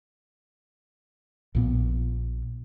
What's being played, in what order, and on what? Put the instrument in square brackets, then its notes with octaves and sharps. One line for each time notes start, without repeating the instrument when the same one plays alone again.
[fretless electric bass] A#1 A#2 B3